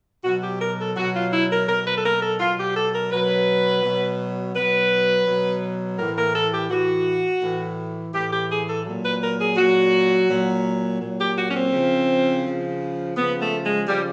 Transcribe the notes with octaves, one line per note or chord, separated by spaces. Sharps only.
B2 F#3 F#4
G4
A#4
A4
B2 F#3 F#4
F4
E4
A#4
B2 F#3 A#4
B4
A4
A#4
A4
B2 F#3 F4
G4
A4
A#4
B2 F#3 B4
B2 F#3
B2 F#3 B4
B2 F#3
A2 E3 A#4
A#4
A4
G4
A2 E3 F#4
A2 E3
A2 E3 G4
G4
G#4
A4
A#2 F#3
B4
A#4
G#4
A#2 F#3 F#4
A#2 F#3
A#2 F#3
G4
F#4
C#4
C4
C#3 F3
C#3 F3
C#3 F3 B3
A3
G#3
C#3 F3 G3